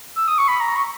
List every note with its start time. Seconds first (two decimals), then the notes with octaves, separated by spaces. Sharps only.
0.16 E6
0.27 D#6
0.38 C#6
0.48 B5
0.60 A#5
0.76 C#6